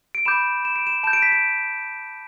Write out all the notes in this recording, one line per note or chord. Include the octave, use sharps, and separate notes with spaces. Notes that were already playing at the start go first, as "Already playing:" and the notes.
D7
B5 D6 G6 E7
E7
D7
E7
A5 G6 E7
D7
B6
D7